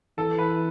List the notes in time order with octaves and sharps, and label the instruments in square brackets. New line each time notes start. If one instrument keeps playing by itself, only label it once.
[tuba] E3 [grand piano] A4
[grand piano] B4